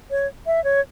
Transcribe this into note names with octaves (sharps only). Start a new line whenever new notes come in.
C#5
E5
C#5